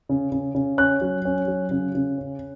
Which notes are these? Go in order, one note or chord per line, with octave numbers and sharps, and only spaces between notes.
C#3
C#3
C#3
C#4 F#6
F#3
C#4
F#3
C#3
C#3
C#4